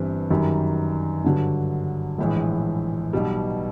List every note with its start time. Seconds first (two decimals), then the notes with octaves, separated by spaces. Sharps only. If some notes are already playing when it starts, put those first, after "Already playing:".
Already playing: G1 G2 E3 G3 C4
0.30 F#2 D#3 G3
1.24 G2 D3 F#3
2.18 A#1 A2 E3 G#3
3.13 B1 B2 G3